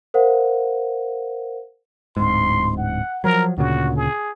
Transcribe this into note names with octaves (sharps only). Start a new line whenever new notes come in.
A#4 C5 F5 F#5
D1 G#2 C6
F#5
F3 F#3 A#4
D2 A#2 C#3 F#4
G#4